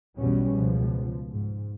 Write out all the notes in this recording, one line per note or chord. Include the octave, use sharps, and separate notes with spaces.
B1 E2 B2 F#3 G3 C#4
C#2 B2 F3
G#2